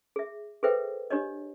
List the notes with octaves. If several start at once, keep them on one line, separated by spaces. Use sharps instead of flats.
G#4 E5
G#4 A4 B4 C5 E5 G5
D4 G4 C#5 D#5